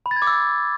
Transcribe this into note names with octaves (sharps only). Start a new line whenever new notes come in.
B5
A6
G#6
D6
E6